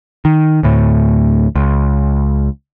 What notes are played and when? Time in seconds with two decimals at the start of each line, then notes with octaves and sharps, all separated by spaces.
0.25 D#3
0.63 D2 A2
1.56 C#2